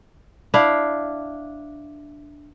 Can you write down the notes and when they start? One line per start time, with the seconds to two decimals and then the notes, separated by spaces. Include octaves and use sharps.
0.54 D4 E4 F5